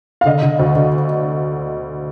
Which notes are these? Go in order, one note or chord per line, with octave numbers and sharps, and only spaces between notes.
F5
D3 D#5
D3
D2
D3